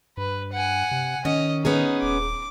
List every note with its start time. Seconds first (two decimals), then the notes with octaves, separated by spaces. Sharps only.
0.17 G2 B4
0.53 F#5 G#5
0.91 C3
1.25 D#3 C#4 D#5
1.65 B3 C#4 D#4 G#4
2.02 D#1 D6